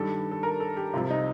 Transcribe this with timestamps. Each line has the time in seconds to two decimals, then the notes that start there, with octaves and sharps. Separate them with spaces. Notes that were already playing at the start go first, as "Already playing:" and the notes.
Already playing: G2 D#3 G3 A4
0.31 A4
0.43 A#4
0.60 A4
0.77 G4
0.93 C2 C3 F3 F4
1.10 D#4